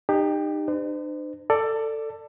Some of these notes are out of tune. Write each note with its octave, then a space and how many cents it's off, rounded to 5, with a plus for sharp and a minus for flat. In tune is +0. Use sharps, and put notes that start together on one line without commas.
D#4 -25 G4 +20
D4 +45 C5 -40
A4 +20 D5 +0